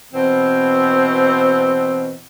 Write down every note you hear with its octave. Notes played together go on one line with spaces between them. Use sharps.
B2 E3 C4